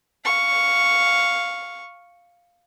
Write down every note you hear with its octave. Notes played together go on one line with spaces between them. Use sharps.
F5 C#6